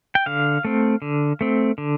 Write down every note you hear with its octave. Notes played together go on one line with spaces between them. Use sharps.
G5
D3 F5
A3 C4
D3
A3 C4
D3